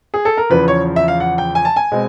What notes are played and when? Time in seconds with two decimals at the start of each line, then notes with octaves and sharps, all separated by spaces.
0.14 G#4
0.25 A4
0.37 A#4
0.50 E2 C#3 F3 B4
0.68 C#5
0.96 E5
1.08 F5
1.20 F#5
1.38 G5
1.55 G#5
1.65 A5
1.76 G#5
1.92 B2 G#3 C4